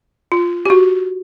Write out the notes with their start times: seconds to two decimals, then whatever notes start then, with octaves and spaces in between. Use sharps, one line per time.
0.32 F4
0.65 G4
0.70 F#4